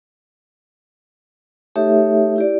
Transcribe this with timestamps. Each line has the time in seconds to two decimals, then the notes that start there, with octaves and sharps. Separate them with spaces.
1.76 A3 D#4 G4 A4 C#5 E5
2.36 E4 G4 D5